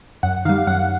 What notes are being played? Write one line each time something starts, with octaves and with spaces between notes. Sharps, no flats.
F#2 F#5
D#3 G3 F5
F#2 F#5